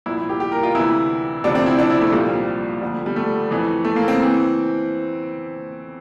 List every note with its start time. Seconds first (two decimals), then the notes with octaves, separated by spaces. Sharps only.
0.06 C2 A#2 F3 E4
0.17 E4
0.29 G4
0.40 G4
0.52 A#4
0.63 F4
0.75 D2 C3 E3 E4
1.44 D2 C3 F3 D4
1.55 C4
1.66 E4
1.79 D4
1.90 E4
2.01 A3
2.13 C2 A#2 F3 G3
2.81 D2 D3 F3
3.06 G3
3.16 A3
3.51 F2 E3
3.85 A3
3.96 A#3
4.08 C4
4.23 E3